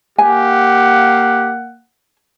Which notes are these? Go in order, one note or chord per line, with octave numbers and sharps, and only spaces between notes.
A#3 G4 F5 F#5 G#5